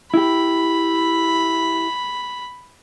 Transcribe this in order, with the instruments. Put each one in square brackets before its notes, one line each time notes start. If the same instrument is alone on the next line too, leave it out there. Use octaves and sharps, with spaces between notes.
[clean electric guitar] E4 G4 [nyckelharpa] B5